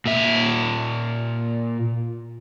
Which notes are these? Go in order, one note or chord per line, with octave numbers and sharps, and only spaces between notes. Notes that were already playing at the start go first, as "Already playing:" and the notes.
A#2 E5